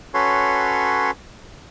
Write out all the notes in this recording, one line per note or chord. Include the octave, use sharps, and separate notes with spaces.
C#4 F#4 A4 B4 C#5 C6